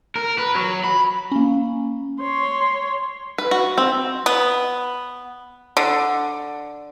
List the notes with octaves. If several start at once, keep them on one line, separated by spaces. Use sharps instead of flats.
A#4
B4
F#3
B5
A#3 C#4
C#5 C6
B4
F#4
C4
B3
D3